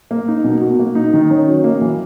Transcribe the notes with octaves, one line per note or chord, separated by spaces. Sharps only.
A#3
D#4
B2
F#4
A#3
D#4
D#3
C#4
F#3
A#3
E3